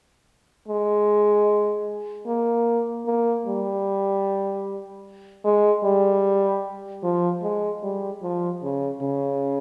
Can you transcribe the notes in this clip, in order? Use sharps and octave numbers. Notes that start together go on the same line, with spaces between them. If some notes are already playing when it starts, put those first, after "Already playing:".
G#3
A#3
A#3
G3
G#3
G3
F3
G#3
G3
F3
C#3
C#3